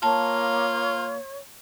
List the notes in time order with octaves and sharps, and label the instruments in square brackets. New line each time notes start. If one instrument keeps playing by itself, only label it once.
[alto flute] A#3 [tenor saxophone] F4 [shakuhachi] C#5 [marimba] A5